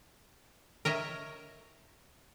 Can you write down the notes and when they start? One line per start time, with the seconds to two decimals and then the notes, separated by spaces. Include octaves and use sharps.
0.85 A#4 C#5 D#5 E5